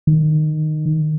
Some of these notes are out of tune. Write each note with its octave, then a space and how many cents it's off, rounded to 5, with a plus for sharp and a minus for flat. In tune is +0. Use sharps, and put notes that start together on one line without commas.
D#3 -15